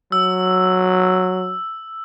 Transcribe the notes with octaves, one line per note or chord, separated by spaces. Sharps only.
F#3 E6